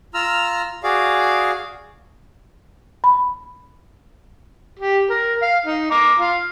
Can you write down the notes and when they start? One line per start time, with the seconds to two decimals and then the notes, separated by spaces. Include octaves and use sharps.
0.14 F4 A#5 E6 F6
0.83 F#4 G#4 D5 F5
3.04 B5
4.79 G4
5.10 A#4
5.42 F5
5.66 D#4
5.91 A#5 D6
6.19 F4 F5